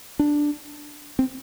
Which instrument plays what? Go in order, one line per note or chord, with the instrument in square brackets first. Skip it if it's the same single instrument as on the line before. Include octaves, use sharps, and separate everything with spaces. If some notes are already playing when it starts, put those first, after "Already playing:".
[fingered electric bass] D4
C4